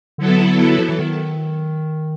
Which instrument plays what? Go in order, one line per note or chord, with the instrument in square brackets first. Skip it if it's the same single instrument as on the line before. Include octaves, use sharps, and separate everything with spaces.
[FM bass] D3 [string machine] F#3 B3 E4 A4
[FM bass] F3
E3
D#3